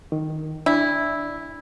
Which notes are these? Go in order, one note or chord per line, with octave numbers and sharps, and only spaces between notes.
D#3
D4 E4 D5